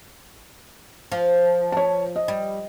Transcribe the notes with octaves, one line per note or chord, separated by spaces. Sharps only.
F3
C#5 A5
D#5
G3